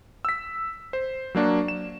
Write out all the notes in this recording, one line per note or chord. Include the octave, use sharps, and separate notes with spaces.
E6 B6
C5
F#3 A#3 D4 F#4
E7